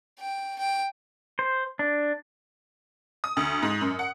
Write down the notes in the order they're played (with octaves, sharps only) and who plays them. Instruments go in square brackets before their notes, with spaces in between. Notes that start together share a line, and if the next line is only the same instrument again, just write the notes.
[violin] G5
G5
[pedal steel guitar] C5
D4
[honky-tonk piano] D#6
D2
G#2
F#2
F#5